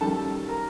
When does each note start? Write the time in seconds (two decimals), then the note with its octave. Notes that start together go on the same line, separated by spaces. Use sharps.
0.01 F#2 D#3 G3 A4 A5
0.49 A#4 A#5